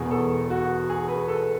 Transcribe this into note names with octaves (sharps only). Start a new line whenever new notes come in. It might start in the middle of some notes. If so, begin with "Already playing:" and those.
Already playing: E1 E2 B2 G#4
A4
F#4
G#4
B4
A4